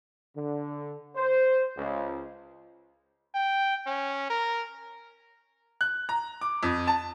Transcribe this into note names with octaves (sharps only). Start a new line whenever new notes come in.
D3
C5
C#2
G5
C#4
A#4
F#6
A#5
D6
F2
A5